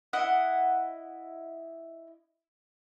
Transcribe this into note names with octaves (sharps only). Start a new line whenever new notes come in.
E4 D#5 F#5